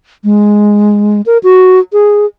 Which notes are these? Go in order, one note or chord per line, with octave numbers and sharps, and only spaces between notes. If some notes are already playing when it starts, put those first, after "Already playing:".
G#3
A#4
F#4
G#4